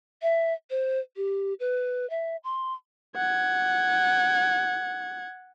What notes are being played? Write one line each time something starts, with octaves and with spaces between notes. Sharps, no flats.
E5
C5
G4
B4
E5
C6
F#5 G#6